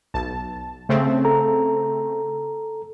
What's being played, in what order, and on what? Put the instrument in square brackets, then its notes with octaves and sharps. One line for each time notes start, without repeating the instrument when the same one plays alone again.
[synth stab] B1 A5
C#3 A3 C4
[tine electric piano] A4 A#5